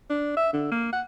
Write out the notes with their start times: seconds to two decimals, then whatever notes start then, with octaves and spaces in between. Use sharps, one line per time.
0.10 D4
0.37 E5
0.53 D3
0.72 A#3
0.93 F#5